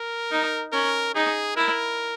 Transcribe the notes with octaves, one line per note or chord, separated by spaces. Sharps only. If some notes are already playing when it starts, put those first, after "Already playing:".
Already playing: A#4
D#4
C#4 A#4
D#4 G#4
E4 A#4